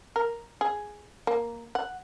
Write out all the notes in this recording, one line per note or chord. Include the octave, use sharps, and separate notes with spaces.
A#4
G#4
A#3
F#5